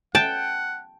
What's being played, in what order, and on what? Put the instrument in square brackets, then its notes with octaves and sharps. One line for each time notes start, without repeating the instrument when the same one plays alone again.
[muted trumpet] F#5 [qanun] G5 [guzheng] A5